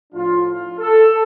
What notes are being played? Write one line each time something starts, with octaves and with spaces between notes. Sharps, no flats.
A2 F3 A3 D4 F4
F4
A4